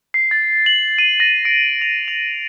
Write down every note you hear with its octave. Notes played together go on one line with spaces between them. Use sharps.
C7
A6
F#7
D#7
A#6
D7
F7
F7